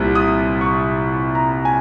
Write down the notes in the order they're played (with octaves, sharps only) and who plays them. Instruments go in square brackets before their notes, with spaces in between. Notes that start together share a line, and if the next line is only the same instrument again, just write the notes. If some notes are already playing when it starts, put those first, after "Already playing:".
Already playing: [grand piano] C2 A#2 G3 C4
D#6
C#6
A#5
G#5